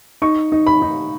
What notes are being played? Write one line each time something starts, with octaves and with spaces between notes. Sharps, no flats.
D#4 C#6
D#4
B5
D#4